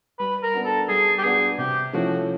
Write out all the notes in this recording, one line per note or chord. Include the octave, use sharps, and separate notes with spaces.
G3 B4
A#4
B3 D4 F#4
A4
G3 G#4
G4
B3 D4 F#4 G#4
C3 G4
F3 A3 C#4 E4 F#4